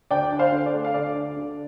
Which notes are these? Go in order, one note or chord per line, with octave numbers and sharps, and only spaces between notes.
D2 D5 G5
D4
C5 F5
D3
D5
A3
F5
D2 D5
D4
D3